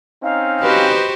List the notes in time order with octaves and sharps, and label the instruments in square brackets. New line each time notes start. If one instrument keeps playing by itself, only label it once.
[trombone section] C4 C#4 D#4 [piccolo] F5
[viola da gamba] F#4 G4 C5 [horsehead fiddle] B4 D#5